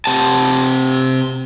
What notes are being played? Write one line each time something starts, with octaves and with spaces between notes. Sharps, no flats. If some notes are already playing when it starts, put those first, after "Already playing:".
C3 A5